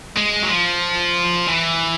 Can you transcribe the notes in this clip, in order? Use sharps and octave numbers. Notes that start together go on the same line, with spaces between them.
G#3
F#3
F3
E3